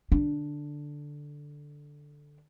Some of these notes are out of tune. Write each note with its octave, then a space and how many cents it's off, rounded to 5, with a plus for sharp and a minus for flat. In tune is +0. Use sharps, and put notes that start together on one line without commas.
D3 +0 D4 +0